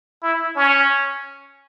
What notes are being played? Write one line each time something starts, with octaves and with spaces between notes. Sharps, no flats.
E4
C#4